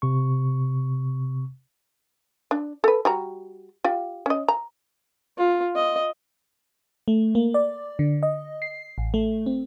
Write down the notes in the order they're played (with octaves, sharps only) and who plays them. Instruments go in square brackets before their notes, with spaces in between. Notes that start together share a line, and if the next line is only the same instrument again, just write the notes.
[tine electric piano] C3 C#6
[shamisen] D4
A4 B4
G3 F#4 A#5
F4 G4
C#4 D#5
A#5
[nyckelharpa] F4
D#5
[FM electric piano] A3
A#3
D5
D3
D#5
C7
A1
A3
C4